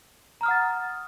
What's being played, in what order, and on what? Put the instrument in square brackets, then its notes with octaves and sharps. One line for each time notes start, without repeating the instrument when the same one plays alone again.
[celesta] A#5
F6
D#6
F#5
A6